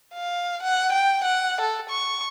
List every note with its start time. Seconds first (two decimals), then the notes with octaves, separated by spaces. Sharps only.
0.14 F5
0.63 F#5
0.93 G5
1.24 F#5
1.61 A4
1.90 C#6